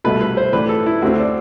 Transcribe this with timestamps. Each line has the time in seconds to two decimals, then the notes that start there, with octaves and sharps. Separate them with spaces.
0.04 C2 B2 A3 B4
0.21 B4
0.37 C5
0.53 A2 E3 A3 D4 B4
0.69 A4
0.86 E4
1.02 D2 D3 A3 C4 F#4
1.19 D4